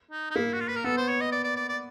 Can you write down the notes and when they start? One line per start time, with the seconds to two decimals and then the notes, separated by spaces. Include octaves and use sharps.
0.11 D#4
0.31 D#4
0.36 A#3 E4
0.53 F#4
0.60 F4
0.68 B4
0.76 A#4
0.84 B3 A4
0.97 C5
1.08 C#5
1.21 D#5
1.32 D5
1.44 D5
1.56 D5
1.69 D5